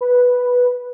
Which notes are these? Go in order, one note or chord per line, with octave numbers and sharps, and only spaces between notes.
B4